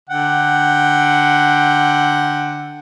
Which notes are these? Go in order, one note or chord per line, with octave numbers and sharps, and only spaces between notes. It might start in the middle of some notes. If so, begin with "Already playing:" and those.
D3 F#5 G5